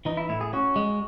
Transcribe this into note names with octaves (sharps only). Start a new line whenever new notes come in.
E3 D#4
E4
A2 E4
G#4
C#4 F#4
G#3